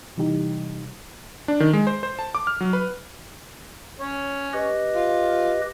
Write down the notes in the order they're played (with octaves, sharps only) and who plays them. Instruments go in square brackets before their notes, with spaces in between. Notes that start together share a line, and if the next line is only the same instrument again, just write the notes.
[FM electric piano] C3 E3 G3 D#4 G4
[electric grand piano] D4
D#3
G#3
C5
C5
A5
D6
F6
F#3
B4
[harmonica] C#4 C#5
[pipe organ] G4 B4 D#5
[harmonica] F4